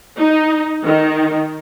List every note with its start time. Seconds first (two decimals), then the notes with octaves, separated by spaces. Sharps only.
0.18 D#4
0.84 D#3